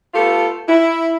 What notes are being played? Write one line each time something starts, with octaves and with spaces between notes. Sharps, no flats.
A3 B3 F4 G4 A4
E4